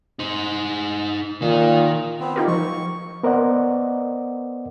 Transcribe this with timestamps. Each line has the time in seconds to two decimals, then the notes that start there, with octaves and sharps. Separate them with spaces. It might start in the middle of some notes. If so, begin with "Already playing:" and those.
0.19 D#4 C5
1.42 A#2 D#3
2.20 B3 C4
2.36 D#4 F4 G4 A#4
2.48 F3 C#6
3.23 B3 A#4 C5 D5 D#5 F#5